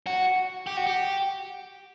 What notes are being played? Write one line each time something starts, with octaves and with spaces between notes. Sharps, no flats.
F#4
G4
F#4
G4